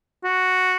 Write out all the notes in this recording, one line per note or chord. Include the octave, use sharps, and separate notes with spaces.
F#4